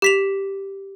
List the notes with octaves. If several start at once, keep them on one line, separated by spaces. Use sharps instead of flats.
G4 B6 F7